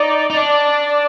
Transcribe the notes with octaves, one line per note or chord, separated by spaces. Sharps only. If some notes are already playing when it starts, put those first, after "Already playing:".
Already playing: D#4 D5
D#4
D4